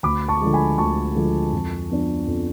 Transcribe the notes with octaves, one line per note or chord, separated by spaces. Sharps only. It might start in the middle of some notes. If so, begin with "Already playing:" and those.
D2 B5 D6
A5 C#6
D3 F3 G#3
G#5 B5
D2 A5 C#6
D3 F3 G#3
F2
F3 B3 D4
F2